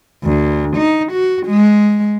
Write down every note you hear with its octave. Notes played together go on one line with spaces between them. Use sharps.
D2
D#4
F#4
G#3